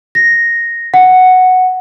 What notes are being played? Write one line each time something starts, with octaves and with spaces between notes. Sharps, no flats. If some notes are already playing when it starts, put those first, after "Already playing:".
A#6
F#5